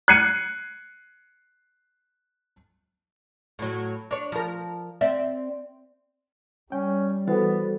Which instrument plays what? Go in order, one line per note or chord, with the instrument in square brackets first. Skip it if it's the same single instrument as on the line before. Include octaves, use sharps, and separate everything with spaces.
[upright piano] F#6 G#6 C7 C#7 D#7
[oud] A2 F#3
D4 C#5
F3 A#4
C4 D5 E5
[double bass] G3 [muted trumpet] C#4 [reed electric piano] G5
[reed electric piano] E3 [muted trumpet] B3 [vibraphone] F#4 A4 C5